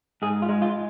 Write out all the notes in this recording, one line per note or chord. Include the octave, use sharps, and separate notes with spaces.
G#2 G#4
F4
G#3
F4